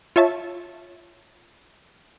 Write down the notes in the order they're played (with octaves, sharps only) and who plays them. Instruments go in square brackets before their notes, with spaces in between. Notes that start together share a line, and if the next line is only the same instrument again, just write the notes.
[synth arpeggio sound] F4 C#5 E5 A5